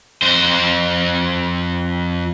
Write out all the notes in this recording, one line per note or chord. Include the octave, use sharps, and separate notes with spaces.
F2 C5